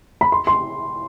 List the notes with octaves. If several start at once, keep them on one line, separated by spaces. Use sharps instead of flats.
B5
C6
C6